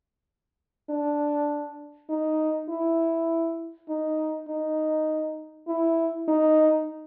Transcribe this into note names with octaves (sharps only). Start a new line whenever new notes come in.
D4
D#4
E4
D#4
D#4
E4
D#4